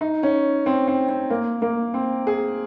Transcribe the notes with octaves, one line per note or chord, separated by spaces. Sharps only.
D#4
C#4
C4
C4
C4
A#3
A#3
C4
G#4